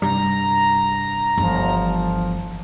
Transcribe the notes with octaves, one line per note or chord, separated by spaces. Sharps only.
G2 C3 G3 A#5
G1 E3 F3